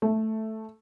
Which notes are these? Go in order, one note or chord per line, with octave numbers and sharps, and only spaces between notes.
A3